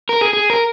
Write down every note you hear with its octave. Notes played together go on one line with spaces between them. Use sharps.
A#4
G#4
G#4
A#4